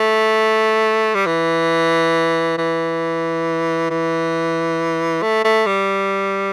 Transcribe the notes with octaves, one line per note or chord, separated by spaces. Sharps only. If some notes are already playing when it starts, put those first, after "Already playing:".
Already playing: A3
G3
E3
E3
E3
A3
A3
G3